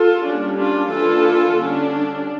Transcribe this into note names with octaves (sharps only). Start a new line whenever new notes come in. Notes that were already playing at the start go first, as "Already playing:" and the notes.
Already playing: F4 A4
G3 A#3 C#4 D4
D4 F4
E3 A#3 D4 F4 A4
D3 G3 C#4 D4